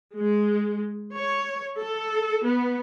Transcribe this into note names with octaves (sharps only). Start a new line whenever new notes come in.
G#3
C#5
A4
B3